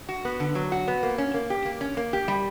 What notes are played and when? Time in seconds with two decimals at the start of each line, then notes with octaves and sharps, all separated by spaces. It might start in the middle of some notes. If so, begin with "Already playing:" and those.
0.09 F#4
0.25 B3
0.40 D3
0.55 F#3
0.72 F#4
0.88 B3
1.03 A#3
1.18 C#4
1.34 A#3
1.50 G4
1.65 A#3
1.81 C#4
1.97 A#3
2.13 G4
2.28 G3